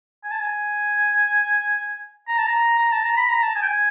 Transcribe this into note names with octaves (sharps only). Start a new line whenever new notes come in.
G#5
A5
G#5
A#5
A5
A#5
A#5
A5
A#5
B5
A#5
A5
G#5
G5
G#5